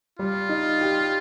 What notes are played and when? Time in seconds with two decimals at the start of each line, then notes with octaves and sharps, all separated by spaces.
0.19 G3 F4
0.49 D#4
0.81 G4